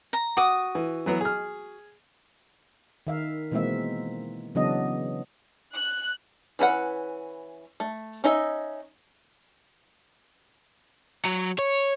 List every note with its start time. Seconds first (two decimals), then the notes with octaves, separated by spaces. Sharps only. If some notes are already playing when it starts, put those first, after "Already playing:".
0.13 A#5
0.37 F#4 D6 D#6
0.75 E3
1.06 E3 F#3 B3
1.21 G#4 F6
3.07 D#3 E5 F5
3.51 B2 E3 G#3 A#3 C4 E5
4.55 C#3 E3 F#3 B3 D4 D#5
5.75 F#6
6.59 E3 C#4 B4 F#5
7.80 A3
8.24 C#4 D#4 D#5 E5
11.25 F#3
11.59 C#5